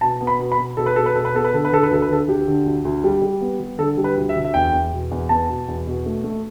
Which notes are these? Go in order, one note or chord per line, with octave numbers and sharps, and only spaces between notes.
B2 A5
B3
B5
B2
B5
B2
B2 A4
B4
B2 A4
B4
B2 A4
B4
B3 A4
B4
D3 A4
B4
D3 A4
B4
D2 A4
B4
D3 A4
D2 G4
D3
D2
D2
G3
G3
B3
G3
D3 A4
G3
B4
D2
E5
D2
E5
E2 G5
E2
B2
E2
B3 A5
B2
E2
B2
A3
A3